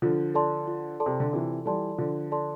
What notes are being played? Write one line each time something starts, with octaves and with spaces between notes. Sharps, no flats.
D3 F3 F4
A4 D5 A5 C6
F4
A4 D5 A5 C6
C3
D3
C3 E3 F4
E3 G3 A4 D5 A5 C6
D3 F3 F4
A4 D5 A5 C6